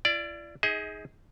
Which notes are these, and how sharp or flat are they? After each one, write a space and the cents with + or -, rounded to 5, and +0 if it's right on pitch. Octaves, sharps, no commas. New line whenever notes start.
E4 +45 D5 +0
D#4 +20 G#4 +0 D#5 +45